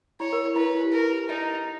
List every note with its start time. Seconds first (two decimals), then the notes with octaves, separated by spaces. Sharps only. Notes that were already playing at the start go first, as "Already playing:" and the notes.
0.20 E4 C#5
0.33 A#4
0.56 E4 B4
0.65 D#4
0.75 E4
0.83 G4
0.93 A#4
1.29 D#4 D#5